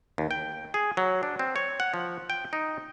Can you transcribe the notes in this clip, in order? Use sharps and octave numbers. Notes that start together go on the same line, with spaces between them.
D#2
G5
G#4
F#3
D4
C4
C#5
F#5
F3
G5
D#4